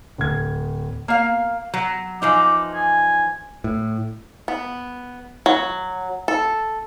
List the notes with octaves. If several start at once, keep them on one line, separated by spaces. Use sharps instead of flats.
D1 G#6
A#3 F5
F#3
E3 F3 D#4 D6
G#5
A2
B3
F#3
A4